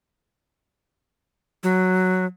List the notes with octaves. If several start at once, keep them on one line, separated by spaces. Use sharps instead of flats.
F#3